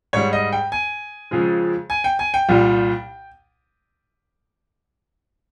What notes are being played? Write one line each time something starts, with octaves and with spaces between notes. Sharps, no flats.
G#2 G3 C#5
D#5
G5
G#5
F2 C#3 F3 G#3
G#5
G5
G#5
G5
C2 A#2 G3